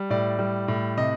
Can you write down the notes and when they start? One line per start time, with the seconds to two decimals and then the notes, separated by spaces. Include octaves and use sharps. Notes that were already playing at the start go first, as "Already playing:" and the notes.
Already playing: G3
0.10 A2 D5
0.39 G3
0.68 A2
0.97 C3 D#5